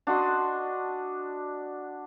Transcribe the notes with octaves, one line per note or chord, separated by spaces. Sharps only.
D4 F#4 D#5 C6